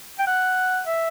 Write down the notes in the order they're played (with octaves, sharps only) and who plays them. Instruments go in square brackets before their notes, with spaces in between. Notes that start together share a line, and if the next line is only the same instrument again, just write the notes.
[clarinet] G5
F#5
E5